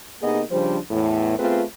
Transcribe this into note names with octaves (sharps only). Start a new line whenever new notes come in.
C3 A#3 B3 D#4 G#4 D#5
C#3 F3 G3 D4 C5
E2 A2
A3 B3 C4 F4 G#4 B4